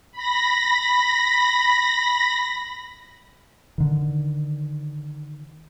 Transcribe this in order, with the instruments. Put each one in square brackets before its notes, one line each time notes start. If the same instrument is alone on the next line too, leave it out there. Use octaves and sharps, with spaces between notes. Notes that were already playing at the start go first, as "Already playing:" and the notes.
[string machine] B5 A#6
[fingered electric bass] D3 D#3